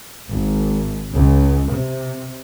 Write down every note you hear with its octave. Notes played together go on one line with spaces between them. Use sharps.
G#1
C#2
C3